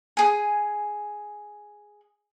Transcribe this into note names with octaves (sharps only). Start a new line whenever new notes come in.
G#4 G#5